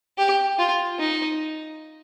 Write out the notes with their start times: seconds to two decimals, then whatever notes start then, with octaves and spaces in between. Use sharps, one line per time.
0.18 G4
0.59 F4
0.99 D#4